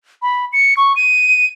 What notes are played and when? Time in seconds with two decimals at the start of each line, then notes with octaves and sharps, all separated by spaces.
0.22 B5
0.53 C#7
0.77 C#6
0.96 D#7